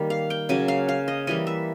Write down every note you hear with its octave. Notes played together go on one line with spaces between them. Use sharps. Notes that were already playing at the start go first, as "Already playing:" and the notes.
Already playing: D#3 G3 A#3
F5
G5
C#3 F#3 A#3 G#5
F5
F5
D#5
E3 G3 A#3 D#5
E5